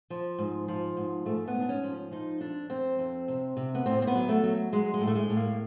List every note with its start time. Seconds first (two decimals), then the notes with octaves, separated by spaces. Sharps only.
0.10 F3
0.39 G#2
0.68 F3
0.97 G#2
1.26 G#2 A3
1.48 B3
1.55 G#2
1.60 D4
1.69 C#4
1.83 F3
2.12 F3 D#4
2.41 F2 D4
2.70 F2 C4
2.99 F2
3.28 C3
3.57 C3
3.75 B3
3.86 A2 C4
4.02 C4
4.07 B3
4.15 F#3
4.29 A3
4.44 F#3
4.72 F#3 G#3
4.94 G#3
5.01 A2
5.07 A3
5.15 G#3
5.30 A2
5.36 A#3